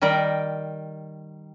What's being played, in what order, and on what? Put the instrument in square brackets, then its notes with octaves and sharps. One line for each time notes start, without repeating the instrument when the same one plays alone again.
[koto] D#3 G3 A#4 D5 G5